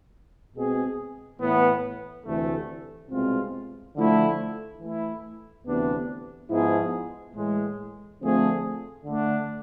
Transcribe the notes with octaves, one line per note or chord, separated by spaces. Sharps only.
B2 G#3 C4 G#4
A2 E3 B3
D2 C3 E3 A3
C2 B2 G#3 C4 F4
D3 F3 A3 E4
E3 A3 E4
D2 C3 E3 B3 D4
G#2 F3 B3 E4 G#4
A2 E3 G#3
D3 F3 A3 C4 G#4
D3 A3 D4